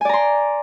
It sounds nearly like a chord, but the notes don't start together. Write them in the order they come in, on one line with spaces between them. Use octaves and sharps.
G#5 D5 A#5 C6